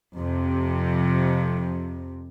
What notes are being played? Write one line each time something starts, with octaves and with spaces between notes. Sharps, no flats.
F2 C3